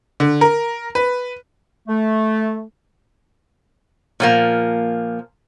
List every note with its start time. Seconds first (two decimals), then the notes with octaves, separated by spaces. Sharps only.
0.20 D3
0.41 A#4
0.95 B4
1.88 A3
4.20 A#2 F3 A#3